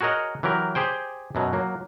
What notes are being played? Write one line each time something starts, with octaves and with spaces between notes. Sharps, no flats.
F#4 G#4 A#4 C#5 D#5 F#5
E3 F#3 G4 A#4
G4 G#4 C5 G5
F#2 B2 F#3
F#3 A#3